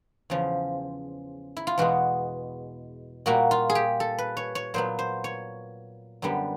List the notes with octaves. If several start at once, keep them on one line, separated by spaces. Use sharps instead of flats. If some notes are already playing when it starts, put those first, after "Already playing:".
E2 C#3 F3
E4
F4
E2 B2 G#3 B3 F#4
A#2 G3 A#3 F#4
F4
G#4
G4
A4
B4
C#5
C#5
A#2 F#3 B3 C5
C5
C#5
F#2 D3 G3 B3